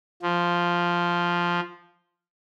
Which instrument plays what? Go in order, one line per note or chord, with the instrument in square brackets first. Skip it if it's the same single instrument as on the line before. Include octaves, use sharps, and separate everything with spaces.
[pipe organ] F3